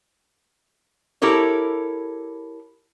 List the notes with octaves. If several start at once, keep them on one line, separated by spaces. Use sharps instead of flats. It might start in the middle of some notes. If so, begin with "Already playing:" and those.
E4 G4 A4 A#4 C#5